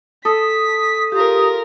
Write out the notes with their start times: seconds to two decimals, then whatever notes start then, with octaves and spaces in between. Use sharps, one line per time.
0.25 A4 D#6 B6
1.12 F4 G4 A#4